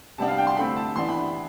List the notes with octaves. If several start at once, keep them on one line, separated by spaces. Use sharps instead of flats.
C3 G3 B3 D4 A5
F5
G5
C6
D3 A3 C4 B5
A5
E3 B3 D4 C6
B5